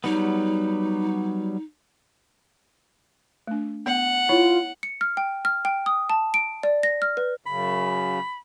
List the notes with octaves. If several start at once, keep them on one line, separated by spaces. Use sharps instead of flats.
F#3 G3 B3 D#4
A3 D4
B3 F#5
E4 F4 C#5 C#6
C#7
F6
G5
F6
G5
D#6
A5
D7
D5
A#6
F6
B4
F#2 C#3 B5